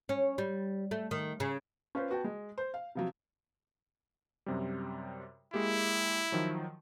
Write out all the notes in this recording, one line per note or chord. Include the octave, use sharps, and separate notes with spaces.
C#4
G3
A3
D#3
C#3
C#4 F4 B4 C5
B3 F#4 G5 A5
G#3
C5
F5
C3 F3 F#3
F#2 C3 G3
G#3 A#3 E4 G4
D#3 F3 F#3